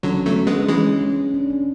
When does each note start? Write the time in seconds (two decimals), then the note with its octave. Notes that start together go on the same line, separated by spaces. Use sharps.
0.03 D3 F#3 C#4
0.25 F#3 A3 B3
0.47 G#3 B3 D4
0.69 E3 G#3 C#4
1.01 C#4
1.34 D4
1.50 C#4